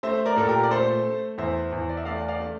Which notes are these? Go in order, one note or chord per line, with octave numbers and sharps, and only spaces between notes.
A3 C5 E5
A#4 D5
A#2 A4
G4 A#4
D5
A3 A4 C5
A3
E2 C5 E5
E2
D5
E5
A3 D5 F5
D5 F5
A3